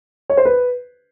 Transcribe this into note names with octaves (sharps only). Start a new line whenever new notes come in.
C#5
C5
B4